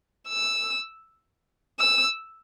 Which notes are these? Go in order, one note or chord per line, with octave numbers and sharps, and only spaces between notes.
E6
E6